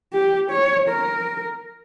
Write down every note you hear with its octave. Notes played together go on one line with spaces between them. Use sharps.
G4
C#5
A#4